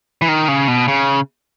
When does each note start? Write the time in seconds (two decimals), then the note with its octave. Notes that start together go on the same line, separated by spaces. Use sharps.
0.22 E3
0.28 D#3
0.48 C#3
0.68 B2
0.88 C#3